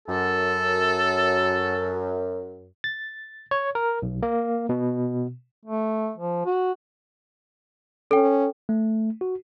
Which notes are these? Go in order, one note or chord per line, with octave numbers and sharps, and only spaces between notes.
F#2 A4
A6
C#5
A#4
B1
A#3
B2
A3
F3
F#4
C#4 A4 G5
A3
F#4